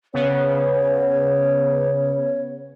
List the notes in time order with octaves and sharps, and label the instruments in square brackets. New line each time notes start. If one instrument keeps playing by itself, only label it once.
[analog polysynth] C#3 B3 [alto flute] C#5